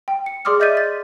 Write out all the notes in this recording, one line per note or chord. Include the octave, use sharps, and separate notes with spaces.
G5
C#7
G#4 D5 C6 D6 D#6 F6
D#5 E5 G6 A6 B6 D#7
A6